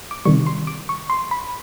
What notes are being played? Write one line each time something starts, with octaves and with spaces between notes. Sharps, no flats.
D6
C3 D#3 G3 C#6
C6
D6
C#6
C6
B5